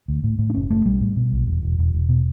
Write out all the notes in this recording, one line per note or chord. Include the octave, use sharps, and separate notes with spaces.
D2
A2
A2
D4
F#1 C#4
F#1 A3
B1 G3
A2
B2
B1
E1
E1
E1
E1
B2